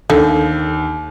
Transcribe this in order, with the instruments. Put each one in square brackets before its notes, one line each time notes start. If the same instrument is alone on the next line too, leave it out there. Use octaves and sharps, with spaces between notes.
[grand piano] D#2 [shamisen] D3